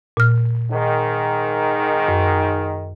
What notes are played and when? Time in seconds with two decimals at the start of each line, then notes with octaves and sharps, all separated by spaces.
0.17 A#2 F6
0.70 G#2 D#3
2.08 F#2